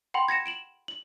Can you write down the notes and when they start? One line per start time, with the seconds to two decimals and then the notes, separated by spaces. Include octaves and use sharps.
0.14 F#5 G5 B5 C6
0.28 G#6 A#6 C#7 E7
0.46 D7 E7 F#7
0.88 F#7